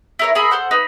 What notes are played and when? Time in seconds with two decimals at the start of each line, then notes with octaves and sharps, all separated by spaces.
0.19 E4 A#4 C#5
0.35 G#4 A#4 E5 B5
0.51 A4 C5 F#5
0.71 D#4 B4